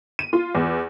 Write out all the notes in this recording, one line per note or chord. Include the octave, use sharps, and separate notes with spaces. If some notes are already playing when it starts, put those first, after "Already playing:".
D#7
F4
E2